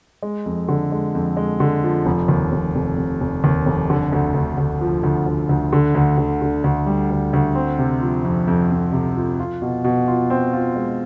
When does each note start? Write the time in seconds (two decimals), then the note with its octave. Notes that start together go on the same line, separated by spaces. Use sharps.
0.22 G#3
0.46 F2
0.69 D3
0.92 G#3
1.15 F2
1.37 G#3
1.60 D3
1.83 F3
2.06 F1
2.28 D#2
2.52 F1
2.75 F1
2.97 F1
3.21 F1
3.44 D#2
3.66 F1
3.90 D3
4.12 D2
4.35 D2
4.58 D2
4.81 F3
5.03 D2
5.26 D2
5.49 D2
5.73 D3
5.95 D2
6.18 D3
6.42 D3
6.64 D2
6.86 G3
7.10 D2
7.33 D2
7.55 C4
7.79 C3
8.01 F3
8.24 F2
8.47 F2
8.71 F2
8.93 C3
9.16 F3
9.39 F4
9.62 B2
9.84 B2
10.07 F4
10.30 C4
10.53 F4
10.76 G#3